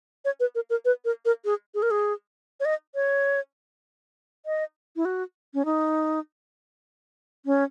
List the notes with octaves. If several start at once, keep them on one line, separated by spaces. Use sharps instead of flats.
C#5
B4
A#4
A#4
B4
A#4
A#4
G#4
G#4
A#4
G#4
C#5
D#5
C#5
D#5
E4
F#4
C#4
D#4
C#4